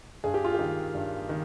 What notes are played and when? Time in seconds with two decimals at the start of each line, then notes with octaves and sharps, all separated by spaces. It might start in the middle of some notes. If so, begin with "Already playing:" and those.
0.24 G2 G#4
0.34 G4
0.44 F4
0.55 D#3 G4
0.95 G2
1.29 D#3